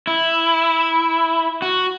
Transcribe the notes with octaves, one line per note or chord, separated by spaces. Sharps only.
E4
F#4